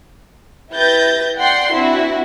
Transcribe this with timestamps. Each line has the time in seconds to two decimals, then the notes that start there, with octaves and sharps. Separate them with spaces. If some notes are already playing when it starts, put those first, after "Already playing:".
0.74 E4 G4 B4 G6 A6 A#6
1.37 D5 F#5 G5 C6
1.73 C4 D4 E4 F#4